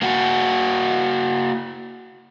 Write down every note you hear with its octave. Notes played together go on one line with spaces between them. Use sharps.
A#3 F#4